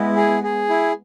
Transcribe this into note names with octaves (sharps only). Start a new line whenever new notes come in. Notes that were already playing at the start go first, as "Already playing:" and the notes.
Already playing: G#3 B3 E4
G#4
G#4
E4